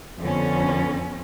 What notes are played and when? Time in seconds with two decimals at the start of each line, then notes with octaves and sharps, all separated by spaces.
0.22 F2 D3 B3 C#4